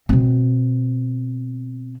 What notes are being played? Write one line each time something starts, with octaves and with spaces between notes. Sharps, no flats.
B2 C4